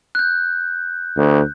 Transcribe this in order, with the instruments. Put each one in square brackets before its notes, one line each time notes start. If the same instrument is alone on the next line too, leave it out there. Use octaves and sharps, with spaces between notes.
[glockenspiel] F#6 G6
[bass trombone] D2